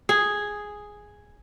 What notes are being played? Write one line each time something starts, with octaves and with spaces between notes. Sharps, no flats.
G#4